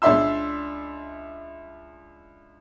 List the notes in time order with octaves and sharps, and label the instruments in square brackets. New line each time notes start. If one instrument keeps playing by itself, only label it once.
[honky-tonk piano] C#2 D4 D5 E5 C6 E6